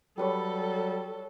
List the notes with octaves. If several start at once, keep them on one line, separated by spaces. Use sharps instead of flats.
F#3 G3 G4 A4 B4 C#5